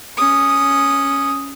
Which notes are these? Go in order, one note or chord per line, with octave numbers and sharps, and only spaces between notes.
C#4 D#6